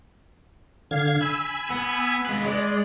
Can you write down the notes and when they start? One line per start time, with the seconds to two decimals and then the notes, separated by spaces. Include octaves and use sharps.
0.91 D3 F5 G#6
1.21 G#5 B5 E6
1.70 B3
2.26 G#3 B4
2.46 G#3 D5